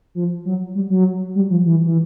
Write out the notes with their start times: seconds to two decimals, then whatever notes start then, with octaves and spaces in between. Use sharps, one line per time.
0.15 F3
0.45 F#3
0.75 G3
0.90 F#3
1.35 G3
1.50 F3
1.65 E3
1.85 E3